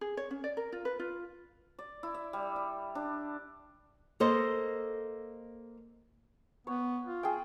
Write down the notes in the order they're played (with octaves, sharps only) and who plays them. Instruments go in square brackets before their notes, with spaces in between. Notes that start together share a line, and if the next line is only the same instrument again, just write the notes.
[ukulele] G#4
C#5
C#4
D5
A#4
F4
B4
F4
[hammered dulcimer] D5
E4
E5
G3
E5
D4
[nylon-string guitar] A#3 A4 C5 D#5
[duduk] B3 [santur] C#5
[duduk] F4
[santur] G#4 G5